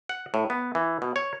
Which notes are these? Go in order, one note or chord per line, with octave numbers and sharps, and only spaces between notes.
F#5
A2
B3
E3
B2
C#5